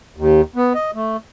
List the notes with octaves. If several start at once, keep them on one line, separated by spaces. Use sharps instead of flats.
D#2
B3
D#5
A3